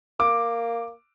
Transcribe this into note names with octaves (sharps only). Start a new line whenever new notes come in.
A#3 D6